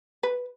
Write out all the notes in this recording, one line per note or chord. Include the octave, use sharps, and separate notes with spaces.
B4